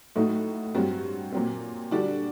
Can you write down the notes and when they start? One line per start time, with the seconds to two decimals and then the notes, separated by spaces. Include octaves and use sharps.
0.15 A2 F#3 A3 D#4 F#4
0.74 G2 F#3 C4 F#4
1.32 A#2 F#3 C4
1.91 D3 G3 D4 F#4